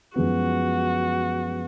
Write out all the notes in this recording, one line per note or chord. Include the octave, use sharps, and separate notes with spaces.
F#2 F3 G#3 B3 F#4